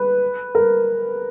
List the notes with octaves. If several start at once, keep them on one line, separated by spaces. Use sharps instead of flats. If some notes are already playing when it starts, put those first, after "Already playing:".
Already playing: B4
A#4